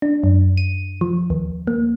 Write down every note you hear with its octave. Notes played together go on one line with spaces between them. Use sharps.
D4
F#2
D#7
F3
D#2
A#3